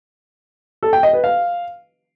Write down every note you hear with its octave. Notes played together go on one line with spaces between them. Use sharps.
A4
G5
D#5
B4
F5